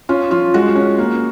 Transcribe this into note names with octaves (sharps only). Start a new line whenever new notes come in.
C#4 F4
F3 F4
G#3 F#4
C#4
A#3